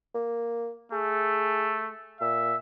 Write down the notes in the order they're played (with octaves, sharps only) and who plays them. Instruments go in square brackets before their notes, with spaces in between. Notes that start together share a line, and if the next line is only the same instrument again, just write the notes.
[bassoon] A#3
[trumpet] A3 [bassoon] G#4
[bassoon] A#2 [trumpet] E5